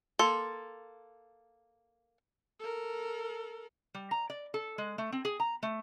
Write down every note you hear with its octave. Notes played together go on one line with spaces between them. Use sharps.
A#3 A4 C6
A4 A#4
G3
A#5
D5
A4
G#3
A3
C4
G#4
A#5
A3